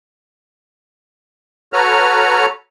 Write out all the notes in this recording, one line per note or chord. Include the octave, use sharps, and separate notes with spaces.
F#4 A4 B4 C#5 A#5 F6